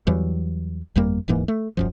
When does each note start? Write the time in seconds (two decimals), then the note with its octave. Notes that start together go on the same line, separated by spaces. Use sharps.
0.07 E2 E3 F#3 G3
0.95 G1 F2 G3 A#3
1.28 D1 G#2 E3 A#3
1.48 A3
1.77 D#1 F#2 F3